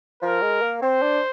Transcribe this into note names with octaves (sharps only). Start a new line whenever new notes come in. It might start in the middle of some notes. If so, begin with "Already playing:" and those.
F3 A#4
G#3
A#3
C4 C5
D4